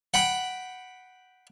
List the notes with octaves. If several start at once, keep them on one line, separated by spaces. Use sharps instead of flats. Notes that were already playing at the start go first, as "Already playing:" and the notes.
F#5 G5 B5